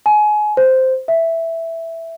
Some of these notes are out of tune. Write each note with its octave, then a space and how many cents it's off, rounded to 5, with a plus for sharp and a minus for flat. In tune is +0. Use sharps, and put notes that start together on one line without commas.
G#5 +25
C5 -5
E5 +0